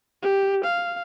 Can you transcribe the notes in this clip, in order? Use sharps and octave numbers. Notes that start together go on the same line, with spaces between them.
G4
F5